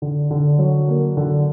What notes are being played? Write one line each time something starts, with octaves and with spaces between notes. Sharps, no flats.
D3
D3
F#3
A#3
D3